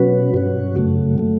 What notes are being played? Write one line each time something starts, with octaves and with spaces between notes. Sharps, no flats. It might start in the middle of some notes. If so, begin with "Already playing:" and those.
Already playing: B2 F#3 C#4 F#4 B4
G2 F#3 C#4 F#4
F#2 C#3 F#3 A3
F#3 A3